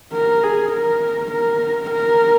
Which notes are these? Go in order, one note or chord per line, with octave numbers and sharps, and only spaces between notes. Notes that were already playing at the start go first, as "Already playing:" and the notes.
A#4
G#4
A#4
A#4
A#4